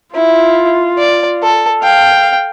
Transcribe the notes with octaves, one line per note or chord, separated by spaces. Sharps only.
E4 F4
D5
A4
F5 G5